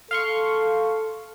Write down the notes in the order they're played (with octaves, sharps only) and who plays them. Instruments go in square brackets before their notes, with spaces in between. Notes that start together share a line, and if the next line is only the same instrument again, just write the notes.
[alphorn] A4 [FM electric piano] F5 C6 C#6